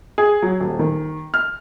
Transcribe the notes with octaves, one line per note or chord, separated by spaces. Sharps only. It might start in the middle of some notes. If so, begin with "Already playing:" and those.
G#4
F#3
D#1
D#3
F6